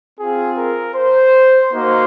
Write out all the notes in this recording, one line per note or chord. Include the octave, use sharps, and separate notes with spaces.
C4 F4 G#4
A#4
C5
A#3 D#4 F#4 C5